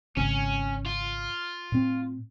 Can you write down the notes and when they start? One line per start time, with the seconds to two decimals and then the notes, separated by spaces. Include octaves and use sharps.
0.17 G#1 C#3 C#4
0.86 F4
1.72 A2 C4